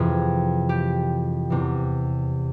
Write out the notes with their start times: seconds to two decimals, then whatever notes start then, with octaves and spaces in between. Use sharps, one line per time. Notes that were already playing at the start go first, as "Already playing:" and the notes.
Already playing: F2 C3 E3 G#4
0.69 G4
1.50 E2 C3 E3